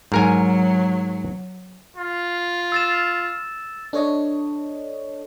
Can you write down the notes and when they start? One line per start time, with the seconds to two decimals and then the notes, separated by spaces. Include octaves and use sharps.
0.12 G#2 F#3 A#4 G#5
1.97 F4
2.72 E6 A6 E7
3.93 D4 A4 C#5 D#5